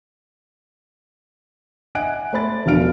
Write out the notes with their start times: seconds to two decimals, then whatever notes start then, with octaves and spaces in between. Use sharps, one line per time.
1.95 D#5 E5 F#5 G#5 F#6 D7
2.33 A3 C5 B5 A6
2.66 E1 D3 F3 F5 F6 D7